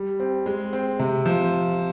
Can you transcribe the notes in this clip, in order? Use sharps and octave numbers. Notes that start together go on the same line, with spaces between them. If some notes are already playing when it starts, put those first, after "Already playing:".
Already playing: G3
C4
G#3
C4
C3
F3